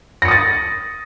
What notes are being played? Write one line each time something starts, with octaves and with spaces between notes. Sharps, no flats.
D#6 A6 A#6 C#7